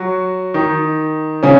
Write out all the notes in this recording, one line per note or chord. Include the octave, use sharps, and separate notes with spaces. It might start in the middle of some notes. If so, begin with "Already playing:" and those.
Already playing: F#3 F#4
D#3 D#4
C#3 C#4